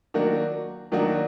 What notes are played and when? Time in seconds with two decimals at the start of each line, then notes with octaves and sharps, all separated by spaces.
0.14 D#3 F#3 A#3 D4 F#4
0.92 D#3 F#3 A#3 D4 F#4